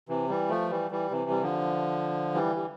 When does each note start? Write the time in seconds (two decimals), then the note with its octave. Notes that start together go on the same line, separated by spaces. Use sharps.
0.09 C3 E3
0.29 E3 G3
0.49 F3 A3
0.70 E3 G3
0.91 E3 G3
1.11 C3 E3
1.31 G3
1.42 D3 F3
2.34 E3 G3
2.56 G3